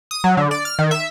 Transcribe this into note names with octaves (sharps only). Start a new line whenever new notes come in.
D#6
F#3
D3
D5
F6
D#3
E5